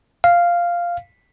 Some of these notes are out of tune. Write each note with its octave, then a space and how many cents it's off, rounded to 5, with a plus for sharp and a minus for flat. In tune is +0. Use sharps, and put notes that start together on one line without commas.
F5 -5